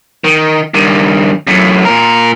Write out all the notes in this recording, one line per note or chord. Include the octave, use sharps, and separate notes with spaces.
D#3
G2 D#3
F#2 A2
A#2 A#4